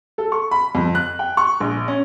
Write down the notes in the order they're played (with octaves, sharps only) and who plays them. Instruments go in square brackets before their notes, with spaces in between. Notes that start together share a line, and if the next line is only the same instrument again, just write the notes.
[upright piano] A4
C#6
B5
F2
F#6
G5
C#6
A#1
C#4